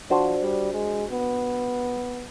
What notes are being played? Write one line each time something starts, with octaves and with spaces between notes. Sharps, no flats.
F3 D4 F#4 C5
G3
G#3
B3